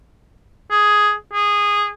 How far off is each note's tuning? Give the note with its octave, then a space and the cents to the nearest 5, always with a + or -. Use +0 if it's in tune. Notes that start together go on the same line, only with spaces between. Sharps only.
G#4 +5
G#4 -15